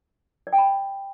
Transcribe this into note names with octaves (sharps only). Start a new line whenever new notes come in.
D5
G5
B5